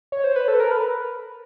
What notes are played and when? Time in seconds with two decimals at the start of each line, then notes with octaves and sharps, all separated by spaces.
0.12 C#5
0.24 C5
0.36 B4
0.48 A4
0.60 A#4
0.71 B4